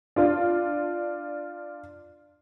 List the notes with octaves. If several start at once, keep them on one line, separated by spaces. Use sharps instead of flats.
D4 F4